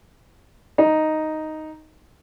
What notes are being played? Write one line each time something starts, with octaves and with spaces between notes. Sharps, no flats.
D#4